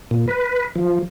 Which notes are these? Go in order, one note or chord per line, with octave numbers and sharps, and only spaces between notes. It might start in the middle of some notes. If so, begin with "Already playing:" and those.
A#2
B4
F3